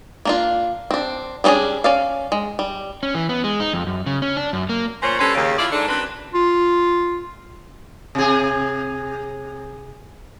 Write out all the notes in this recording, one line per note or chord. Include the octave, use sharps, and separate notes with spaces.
A#3 D4 F4
C4 D4
G3 B3 C#4 D4 G#4
C#4 D5 F5
G#3
G3
C#4
E3
B3
G#3
D#4
F2
F#2
C#3
C#4
D4
F#2
A#3
A#2 C#4 C5
G3 C#4 D4 A4 B4 C5
D#2 C#3
E4 F4 D5
G#2 D4 A4
F#2 C4 D4 B4
F4
C3 G#4